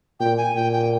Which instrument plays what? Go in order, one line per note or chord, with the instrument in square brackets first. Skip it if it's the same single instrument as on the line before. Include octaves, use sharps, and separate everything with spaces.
[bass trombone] A#2 [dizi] G5
[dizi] G#5
[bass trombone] A#2 [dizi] G5
[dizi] G5